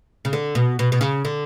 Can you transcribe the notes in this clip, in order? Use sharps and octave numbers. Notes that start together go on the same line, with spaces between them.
C#3
D3
B2
B2
B2
C#3
D3